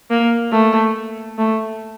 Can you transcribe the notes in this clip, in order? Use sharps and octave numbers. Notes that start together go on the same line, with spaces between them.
A#3
A3
A3